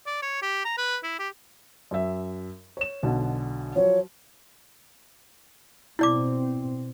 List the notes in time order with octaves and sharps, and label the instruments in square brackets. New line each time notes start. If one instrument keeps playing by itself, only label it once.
[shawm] D5
C#5
G4
A#5
B4
E4
G4
[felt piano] F#2 E5
C#5 E7
B1 B2 D3
[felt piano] F3 F#3 [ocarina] C#5
[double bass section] B2 C4 [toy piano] E4 D5 D6